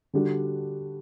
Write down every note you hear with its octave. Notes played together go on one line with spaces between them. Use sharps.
D3 G3 D4 F#4